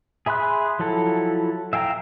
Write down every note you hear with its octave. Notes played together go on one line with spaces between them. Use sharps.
G#4 E5 B5 C6 F#6
F3 F#3 E4 A4
E5 F5 G5 G#5 A#5